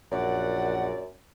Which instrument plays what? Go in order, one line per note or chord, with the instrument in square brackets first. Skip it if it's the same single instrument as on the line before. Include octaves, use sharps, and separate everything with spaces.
[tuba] A#1 [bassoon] F#2 [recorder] D5 [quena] F#5